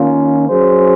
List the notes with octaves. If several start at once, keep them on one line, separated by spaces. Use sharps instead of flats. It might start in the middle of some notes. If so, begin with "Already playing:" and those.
Already playing: D#3 A#3 C#4 F4
F#3 C#4 G#4 C5